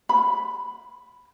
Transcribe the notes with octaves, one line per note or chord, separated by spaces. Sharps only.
B5